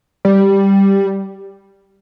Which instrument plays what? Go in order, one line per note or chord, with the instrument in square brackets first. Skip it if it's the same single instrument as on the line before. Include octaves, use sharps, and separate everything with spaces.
[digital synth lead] G3